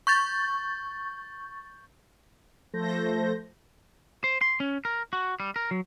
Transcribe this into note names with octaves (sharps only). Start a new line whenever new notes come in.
C#6 G6 A6
F3 A3 A4 C5 G6 A#6
C5
C6
C#4
A#4
F#4
G3
A#4
F#3